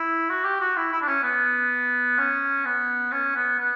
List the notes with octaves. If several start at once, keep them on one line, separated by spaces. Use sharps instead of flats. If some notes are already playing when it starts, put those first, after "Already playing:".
Already playing: E4
F#4
G4
F#4
E4
E4
D4
C#4
B3
C#4
B3
C#4
B3
B3